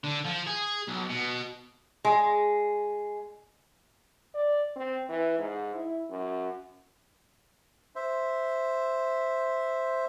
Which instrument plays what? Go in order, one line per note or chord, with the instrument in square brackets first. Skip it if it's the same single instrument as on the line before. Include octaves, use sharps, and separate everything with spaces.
[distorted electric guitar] D3
F3
G#4
B1
B2
[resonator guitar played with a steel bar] G#3
[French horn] D5
C4
E3
G#2
E4
F#2
[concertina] C5 E5